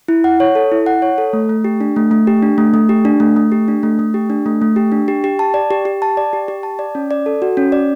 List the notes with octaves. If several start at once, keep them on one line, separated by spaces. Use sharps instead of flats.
E4
F#5
C#5
A4
E4
F#5
C#5
A4
A3
A3
G4
D4
A3
A3
G4
D4
A3
A3
G4
D4
A3
A3
G4
D4
A3
A3
G4
D4
A3
A3
G4
D4
G4
G4
A5
D5
G4
G4
A5
D5
G4
G4
A5
D5
C#4
D5
A4
F#4
C#4
D5